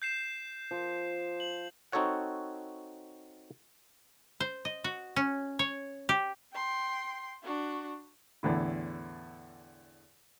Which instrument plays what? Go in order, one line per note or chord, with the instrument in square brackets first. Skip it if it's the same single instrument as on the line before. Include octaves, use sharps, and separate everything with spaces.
[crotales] G6 C7 E7
[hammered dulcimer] F3
[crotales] F#7
[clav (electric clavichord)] C4 D#4 F#4 A4 C#5 F#5
[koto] C5
D#5
F#4
C#4
C#5
G4
[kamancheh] G5 C6
D4 F#4
[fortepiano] E2 A2 D3 E4